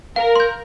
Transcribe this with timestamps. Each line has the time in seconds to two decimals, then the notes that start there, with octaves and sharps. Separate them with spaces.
0.16 A#4 F5
0.36 C6 G6